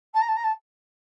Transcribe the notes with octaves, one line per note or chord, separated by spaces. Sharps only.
A5
A#5
A5
A#5
A5